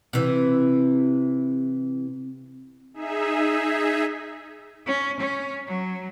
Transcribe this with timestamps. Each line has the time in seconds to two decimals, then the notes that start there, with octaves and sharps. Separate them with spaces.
0.13 C3 E3
2.94 D#4 G#4 E5
4.87 C#4
5.21 C#4
5.68 F#3